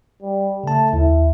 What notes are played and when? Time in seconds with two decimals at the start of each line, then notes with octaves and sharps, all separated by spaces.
0.22 G3
0.64 C#3 A3 A5
0.93 D#2 E4